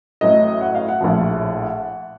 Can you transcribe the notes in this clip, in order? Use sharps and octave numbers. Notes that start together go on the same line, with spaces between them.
A1 A2 F#3 D#5
F#5
F5
F#5
A#1 A2 F3